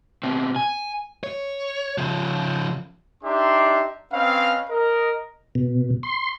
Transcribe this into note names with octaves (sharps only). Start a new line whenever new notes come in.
B2 C4
G#5
C#5
C#3 F3
D4 D#4 G4 E5 A#5 C6
C4 C#4 B4 D#5 F5
A#4 D#5
B2
C6